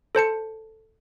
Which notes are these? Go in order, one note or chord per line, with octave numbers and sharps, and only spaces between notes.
A4 C5 A5 C#7